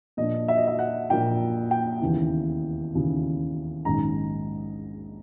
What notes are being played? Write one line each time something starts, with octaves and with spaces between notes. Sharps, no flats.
A#2 F3 A#3 D4 D#5
E5
D#5
E5
F#5
A#2 F3 A#3 D4 G5
G5
E1 D#2 C#3 E3
E1 D#2 C#3 E3
A#1 G#2 D#3 G#3 C#4 A#5